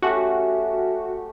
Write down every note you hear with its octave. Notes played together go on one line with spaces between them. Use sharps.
A3 C#4 F#4 G4